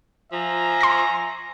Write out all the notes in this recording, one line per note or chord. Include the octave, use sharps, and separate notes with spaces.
F3 E5 G#5 A#5
C6 A#6